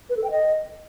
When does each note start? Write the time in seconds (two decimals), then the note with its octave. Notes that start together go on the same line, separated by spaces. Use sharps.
0.10 B4
0.17 A4
0.24 G5
0.31 D#5